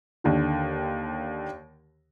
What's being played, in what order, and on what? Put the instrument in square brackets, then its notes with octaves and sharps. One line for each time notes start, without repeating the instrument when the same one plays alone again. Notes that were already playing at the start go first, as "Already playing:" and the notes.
[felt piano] D#2 D3 D#3